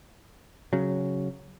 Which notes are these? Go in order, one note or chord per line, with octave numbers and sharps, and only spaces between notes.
C#3 F#3